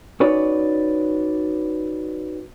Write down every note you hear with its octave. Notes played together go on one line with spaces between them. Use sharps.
C#4 D#4 F#4 B4 C#5 D5